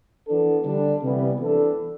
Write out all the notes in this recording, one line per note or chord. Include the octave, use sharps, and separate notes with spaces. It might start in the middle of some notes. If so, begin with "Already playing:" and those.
E3 B3 D4 A4
D3 G3 D4
C3 E3 G3 B3
E3 B3 D4 A4